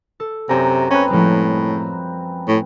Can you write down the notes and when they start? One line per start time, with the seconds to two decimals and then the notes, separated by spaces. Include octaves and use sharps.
0.20 A4
0.49 F#2 C3 A#5
0.90 C4 C#4 B4
1.10 A2 F3 G3 G#3
2.48 A2